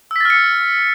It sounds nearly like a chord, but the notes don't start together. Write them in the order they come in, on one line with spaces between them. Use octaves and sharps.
E6 B6 A6 F6 C#7